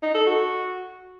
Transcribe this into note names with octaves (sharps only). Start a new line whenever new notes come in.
D#4
A4
F#4